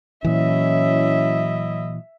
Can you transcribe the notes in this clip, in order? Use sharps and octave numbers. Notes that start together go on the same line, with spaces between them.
A#2 E3 F#3 C#4 E4 D#5 E5